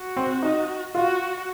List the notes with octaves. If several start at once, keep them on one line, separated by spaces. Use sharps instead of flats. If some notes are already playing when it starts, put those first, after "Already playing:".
Already playing: F#4
C4
D#4
F4 F#4